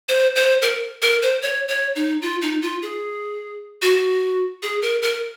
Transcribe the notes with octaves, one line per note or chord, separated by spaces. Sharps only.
C5
C5
A#4
A#4
C5
C#5
C#5
D#4
F4
D#4
F4
G#4
F#4
G#4
A#4
A#4